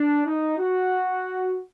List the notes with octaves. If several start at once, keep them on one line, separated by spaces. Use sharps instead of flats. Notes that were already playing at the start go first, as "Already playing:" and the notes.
Already playing: D4
D#4
F#4